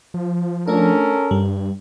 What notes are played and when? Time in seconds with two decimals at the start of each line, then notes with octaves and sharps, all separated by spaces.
0.14 F3
0.68 A3 C#4 D4 A4 A#4
1.31 G2 G3